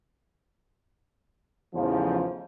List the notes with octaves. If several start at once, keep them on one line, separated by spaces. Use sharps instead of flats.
A1 E2 G#2 C#3 F3